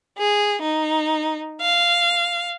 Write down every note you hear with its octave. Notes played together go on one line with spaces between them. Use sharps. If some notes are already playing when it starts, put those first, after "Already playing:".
G#4
D#4
F5